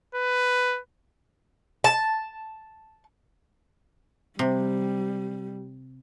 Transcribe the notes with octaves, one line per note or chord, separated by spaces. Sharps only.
B4
A5
C3 G3